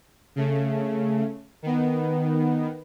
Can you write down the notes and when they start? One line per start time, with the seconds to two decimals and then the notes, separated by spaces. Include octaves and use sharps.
0.36 C#3 A3
1.62 D#3 B3